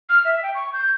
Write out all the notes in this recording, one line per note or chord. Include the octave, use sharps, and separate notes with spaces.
F6
E5
G5
C#6
G6